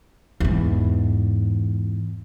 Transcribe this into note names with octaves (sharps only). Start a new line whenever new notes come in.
E2 G#2